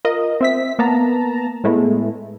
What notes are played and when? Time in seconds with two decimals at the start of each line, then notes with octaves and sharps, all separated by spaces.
0.05 F4 A#4 D#5
0.41 C4 E5 B6
0.79 A#3 B3 A5 A#5
1.64 A2 G#3 A3 B3 E4